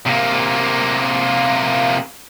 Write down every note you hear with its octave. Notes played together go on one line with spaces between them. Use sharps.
C3 A#3